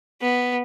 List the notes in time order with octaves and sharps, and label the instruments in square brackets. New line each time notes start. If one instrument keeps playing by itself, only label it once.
[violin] B3